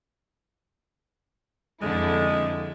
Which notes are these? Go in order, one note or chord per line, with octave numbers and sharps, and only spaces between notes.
F2 D3 G#3 E4